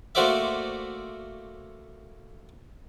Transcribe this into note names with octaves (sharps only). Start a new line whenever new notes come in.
A3 A#3 F#4 C5 D5 E5